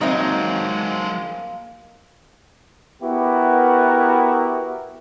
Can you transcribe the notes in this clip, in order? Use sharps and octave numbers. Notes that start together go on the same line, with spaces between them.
F#3 G#3 A#3 C4 D#4 D#5 E5 D#6
B3 E4 F#4 G4 A#4